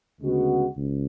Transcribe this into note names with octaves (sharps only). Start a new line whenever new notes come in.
D2 C#3 G#3 B3 F#4
C#2